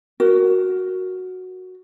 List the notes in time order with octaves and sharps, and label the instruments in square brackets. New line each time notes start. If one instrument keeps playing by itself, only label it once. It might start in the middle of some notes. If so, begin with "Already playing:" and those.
[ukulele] F#4 A#4